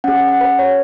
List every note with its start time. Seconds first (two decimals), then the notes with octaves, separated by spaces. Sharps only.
0.04 C#4 G#4 F#5
0.16 F#5
0.28 F#5
0.41 B4
0.59 C#5